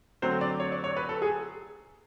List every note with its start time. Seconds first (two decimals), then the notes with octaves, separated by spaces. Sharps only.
0.22 D3 F#3 A3 C4 C5
0.41 D5
0.60 C#5
0.72 D5
0.84 C#5
0.97 B4
1.09 A4
1.22 G#4